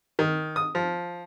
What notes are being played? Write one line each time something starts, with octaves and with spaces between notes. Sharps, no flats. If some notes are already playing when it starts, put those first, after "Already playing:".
D#3
D#6
F3